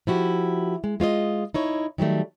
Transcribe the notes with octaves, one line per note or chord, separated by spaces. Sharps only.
F3 E4 F#4 G4
G#3
G#3 F4 C#5 D#5
D#4 E4 C#5
D#3 F#3 G3 A3